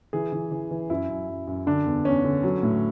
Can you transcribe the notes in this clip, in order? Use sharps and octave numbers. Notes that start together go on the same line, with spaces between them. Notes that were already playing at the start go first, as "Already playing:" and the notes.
E3 G#4
E3
E3
E3
F#2 E4
F#2
F#2
F#2
D3 D4
E2
E2 C#4
D3
F#3
A2